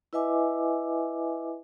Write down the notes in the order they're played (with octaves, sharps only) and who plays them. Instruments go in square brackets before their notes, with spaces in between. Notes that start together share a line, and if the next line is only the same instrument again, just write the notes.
[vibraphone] E4 B4 D#5 E5 G#5 D6